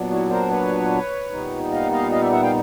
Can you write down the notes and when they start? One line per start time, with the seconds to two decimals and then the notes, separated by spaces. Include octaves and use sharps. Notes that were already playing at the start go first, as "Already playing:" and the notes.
Already playing: A#2 F#3 B3 D4
0.10 E4 F#4
0.30 A#4 C5
0.50 B4 C#5
1.31 A#2 G3 B3 D#4
1.72 D#5 F5
1.92 D#5 F5
2.12 D#5 F5
2.22 D5 E5
2.32 E5 F#5
2.42 F5 G5